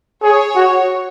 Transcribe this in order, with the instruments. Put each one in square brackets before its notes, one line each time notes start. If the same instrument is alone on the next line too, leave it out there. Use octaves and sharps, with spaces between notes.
[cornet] G#4 [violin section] C#5
[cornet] F#4